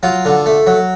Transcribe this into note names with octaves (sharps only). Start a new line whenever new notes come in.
F#3 F4
D3
A3
F#3